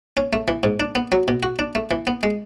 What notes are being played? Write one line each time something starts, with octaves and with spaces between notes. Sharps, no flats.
C#4
A3
E3
G#2
D4
B3
F#3
B2
F#4
D4
A3
E3
B3
G#3